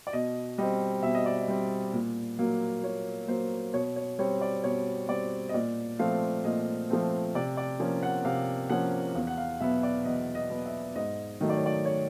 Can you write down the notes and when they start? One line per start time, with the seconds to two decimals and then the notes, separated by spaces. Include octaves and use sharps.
0.07 D5
0.13 B2 D#5
0.58 G3 C4 D#5
1.03 B2 E5
1.15 D#5
1.26 D5
1.37 D#5
1.48 G3 C4
1.93 A#2
2.39 F#3 A#3
2.83 A#2 C#5
3.28 F#3 A#3 C5
3.73 B2 C#5
3.96 C#5
4.19 G3 C4 C#5
4.41 D5
4.64 B2 C#5
5.09 G3 C4 D5
5.49 D#5
5.54 A#2 D5
5.99 F3 A3 C4 F5
6.44 A#2 D#5
6.90 F3 A3 C4
7.35 C3 D5
7.57 D5
7.80 F3 A#3 C#4
8.03 F#5
8.25 C3 F5
8.70 F3 A#3 C#4 F#5
9.15 E2 F5
9.27 F#5
9.38 F5
9.60 B2 F#3 B3 E5
9.83 D5
10.05 E2 D#5
10.35 D#5
10.50 B2 F#3 B3
10.66 E5
10.96 G#2 D#5
11.41 D#3 F#3 A3 D#5
11.50 D5
11.57 C#5
11.66 D5
11.85 C#5